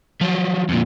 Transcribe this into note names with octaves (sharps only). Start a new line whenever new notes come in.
F3 F#3
F2 A#2